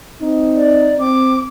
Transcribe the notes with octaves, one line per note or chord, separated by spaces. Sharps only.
C4 D#4
D5
C4 D6